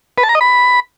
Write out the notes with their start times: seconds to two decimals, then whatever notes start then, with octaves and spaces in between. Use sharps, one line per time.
0.18 B4
0.23 A5
0.29 A#5
0.35 D#5
0.41 B5